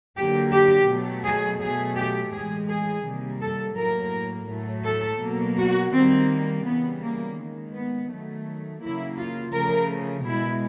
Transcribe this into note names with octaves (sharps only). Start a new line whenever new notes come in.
D3 F#3 A#3 G4
G4
B2 F#3 A3
G#4
B2 F#3 A3 G#4
G4
A2 E3 G#3 G#4
G#4
C3 D#3 G3 A#3
A4
A2 F#3 A#3 A#4
A2 F#3 A3
A4
B2 F#3 A#3
F#4
D#3 G3 A#3 C4
C#3 E3 G3 B3
A#3
D#3 G#3
B3
D#3 F#3 A3
C#3 F#3 A#3 E4
F4
C#3 F3 A3 A#4
B2 G#3 E4